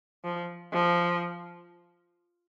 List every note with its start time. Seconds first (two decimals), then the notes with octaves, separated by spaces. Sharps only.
0.24 F3
0.73 F3